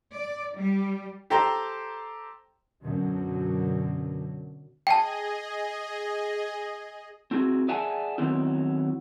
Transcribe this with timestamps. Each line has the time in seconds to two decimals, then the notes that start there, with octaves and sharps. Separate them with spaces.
0.13 D5
0.55 G3
1.30 G4 A4 C5 G5 A#5 C6
2.84 F#2 B2 D3 F#3
4.87 G#4 D#5 G5 A5
7.31 C4 E4 F#4 G#4
7.68 G#4 D5 E5 F#5 G#5 A5
8.18 D#3 F#3 B3 C4 E4